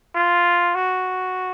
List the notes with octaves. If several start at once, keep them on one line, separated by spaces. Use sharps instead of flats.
F4
F#4